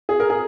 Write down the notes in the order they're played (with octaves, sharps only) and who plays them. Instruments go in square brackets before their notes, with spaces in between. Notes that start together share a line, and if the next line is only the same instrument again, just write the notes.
[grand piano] G#4
A#4
G#4